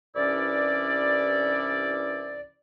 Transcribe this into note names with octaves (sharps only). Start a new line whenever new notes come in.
C2 G2 E3 C#4 E4 D5